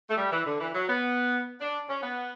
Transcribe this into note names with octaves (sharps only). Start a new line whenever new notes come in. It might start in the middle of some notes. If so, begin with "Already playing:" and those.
A3
G3
E3
D3
E3
F#3
B3
D4
C#4
B3